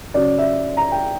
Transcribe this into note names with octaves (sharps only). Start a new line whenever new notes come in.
C#3 F#3 C#4 D5
E5
A#5
G5